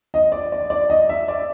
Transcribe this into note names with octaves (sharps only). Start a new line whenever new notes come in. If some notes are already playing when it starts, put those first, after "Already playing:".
D#5
D5
D5
D5
D#5
E5
D5